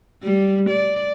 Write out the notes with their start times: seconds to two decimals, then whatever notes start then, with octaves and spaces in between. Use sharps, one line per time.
0.23 G3
0.70 D5